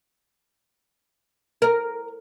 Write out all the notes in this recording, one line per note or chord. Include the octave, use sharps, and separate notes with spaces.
A#4